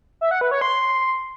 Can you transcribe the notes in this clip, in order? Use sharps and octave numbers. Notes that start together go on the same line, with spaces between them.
E5
F#5
B4
C#5
C6